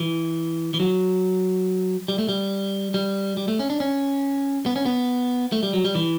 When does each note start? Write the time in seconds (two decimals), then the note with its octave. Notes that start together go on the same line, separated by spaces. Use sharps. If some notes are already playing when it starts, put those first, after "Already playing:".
Already playing: E3
0.74 E3
0.80 F#3
2.08 G3
2.18 A3
2.29 G3
2.94 G3
3.37 G3
3.48 A3
3.59 C#4
3.70 D4
3.80 C#4
4.66 B3
4.76 C#4
4.86 B3
5.52 A3
5.63 G3
5.73 F#3
5.85 G3
5.95 E3